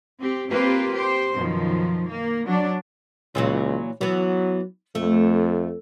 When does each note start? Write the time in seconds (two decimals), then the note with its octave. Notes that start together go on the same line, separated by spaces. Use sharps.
0.20 C4 G4
0.50 A#3 C4 F4 G4 B4 C5
0.92 G4 C5
1.34 F#2 B2 D#3 F3
2.09 A#3
2.47 F#3 D4
3.35 C#2 A#2 E3 F#3
4.01 E3 F#3 B3
4.95 F2 A3